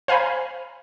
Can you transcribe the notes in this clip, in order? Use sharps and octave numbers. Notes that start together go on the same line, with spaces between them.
C5 F5 G#5 A#5 B5